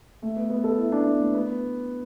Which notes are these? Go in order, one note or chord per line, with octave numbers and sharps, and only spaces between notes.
A3
B3
B3
A4
E4
D4
B3
A3
B3